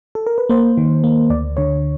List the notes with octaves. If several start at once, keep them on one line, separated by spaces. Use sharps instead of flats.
A4
A#4
B4
A#3 C5
D#3
A#3
D2 D5
D3 C#5